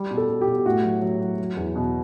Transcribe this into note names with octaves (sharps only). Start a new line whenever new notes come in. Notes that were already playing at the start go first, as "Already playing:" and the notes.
Already playing: G3
B2
A4
B2
G4
B2
A2 F#4
F#3
F#3
F#3
F#3
E2
B2